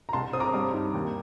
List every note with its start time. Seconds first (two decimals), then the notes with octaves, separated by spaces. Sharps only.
0.09 A#5
0.13 C2 A5 C6
0.33 C4 D#6
0.40 A#5 D6
0.54 G2
0.74 D#4
0.94 D#2